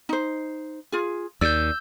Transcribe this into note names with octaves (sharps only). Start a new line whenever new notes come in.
D#4 C5
F4 G#4
D#2 D5 E6 G6